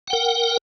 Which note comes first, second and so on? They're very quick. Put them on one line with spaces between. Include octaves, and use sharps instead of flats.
F#5 G5 A#4